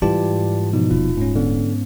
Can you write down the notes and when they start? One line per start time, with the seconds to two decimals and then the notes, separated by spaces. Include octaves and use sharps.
0.02 G#2 E3 G3 F4 G4 D5 A5
0.73 B2 F3 D#4
0.91 D#1 F4
1.17 G#2 C#4
1.36 D3 B3